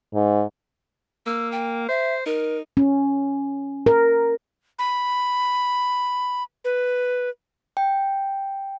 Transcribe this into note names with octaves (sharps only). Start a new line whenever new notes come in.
G#2
A#3 E6
G5
C5 E5
D#4 A#4
C#4
A#4
B5
B4
G5